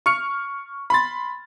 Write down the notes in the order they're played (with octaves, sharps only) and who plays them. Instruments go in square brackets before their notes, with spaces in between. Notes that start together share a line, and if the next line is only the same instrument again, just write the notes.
[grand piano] C#6 F6 C#7
B5 C6 A6